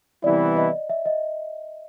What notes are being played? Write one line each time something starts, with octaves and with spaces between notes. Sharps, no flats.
C3 E3 G3 B3 E4 D5
D#5
E5
D#5